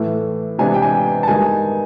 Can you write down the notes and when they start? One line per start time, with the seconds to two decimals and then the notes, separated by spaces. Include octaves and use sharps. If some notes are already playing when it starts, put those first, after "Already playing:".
Already playing: A2 E3 A3
0.59 C3 E3 G#3 B3 D4 G#5
0.74 G5
0.82 G#5
1.23 A5
1.28 G2 D#3 G#3 B3 D#4 G#5